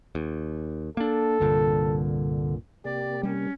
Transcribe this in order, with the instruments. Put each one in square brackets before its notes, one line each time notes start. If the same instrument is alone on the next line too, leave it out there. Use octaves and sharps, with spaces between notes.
[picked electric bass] D#2
[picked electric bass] A#3 D4 [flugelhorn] A4
[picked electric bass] C2 G2 A#2 [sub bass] D3
[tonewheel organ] C3 A#3 [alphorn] G4 [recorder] D5
[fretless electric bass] G3 [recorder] C#4